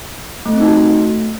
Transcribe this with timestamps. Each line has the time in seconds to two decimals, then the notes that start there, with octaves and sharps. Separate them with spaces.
0.46 A3
0.53 C4
0.60 D#4
0.67 F#4
0.75 A3